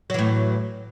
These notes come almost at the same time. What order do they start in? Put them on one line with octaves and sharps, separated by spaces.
F#3 E3 A2